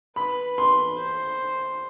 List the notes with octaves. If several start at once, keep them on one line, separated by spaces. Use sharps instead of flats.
B4 B5
C6
C5